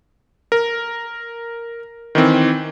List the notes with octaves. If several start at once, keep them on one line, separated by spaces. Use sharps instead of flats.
A#4
D#3 E3 C4